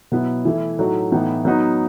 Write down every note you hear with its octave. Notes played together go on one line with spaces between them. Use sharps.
B2 F#3 B3 E4
E3 A3 E4
A2 F#3 A3 D#4 F#4
A2 E3 B3 D#4
F#3 B3 D#4 F#4